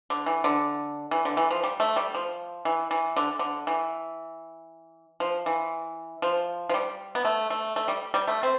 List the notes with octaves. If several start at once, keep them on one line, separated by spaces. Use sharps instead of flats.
D3
E3
D3
E3
D3
E3
F3
G3
A3
G3
F3
E3
E3
D3
D3
E3
F3
E3
F3
F3
G3
B3
A3
A3
A3
G3
G3
A3
C4